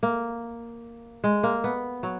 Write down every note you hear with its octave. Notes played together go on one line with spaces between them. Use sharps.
A#3
G#3
A#3
B3
F#3